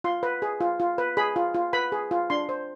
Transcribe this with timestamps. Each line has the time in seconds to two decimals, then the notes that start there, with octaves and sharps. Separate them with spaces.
0.04 F4 C6
0.23 B4
0.42 G#4
0.61 F4
0.80 F4
0.98 B4
1.17 G#4 B5
1.36 F4
1.54 F4
1.73 B4 B5
1.92 G#4
2.11 F4
2.30 D4 C6
2.49 C5